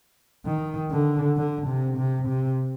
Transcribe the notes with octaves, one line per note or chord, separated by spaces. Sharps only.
D#3
D3
D3
C3
C3
C3